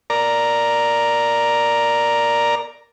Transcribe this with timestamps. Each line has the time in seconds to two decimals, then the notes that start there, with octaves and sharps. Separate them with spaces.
0.10 A#4 D5 A#5